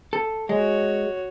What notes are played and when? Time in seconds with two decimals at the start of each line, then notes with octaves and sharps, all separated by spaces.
0.13 A4
0.49 G#3 F#4 C#5